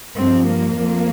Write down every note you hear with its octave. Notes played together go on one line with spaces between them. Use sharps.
G2 F3 C4
A#3
F2 F3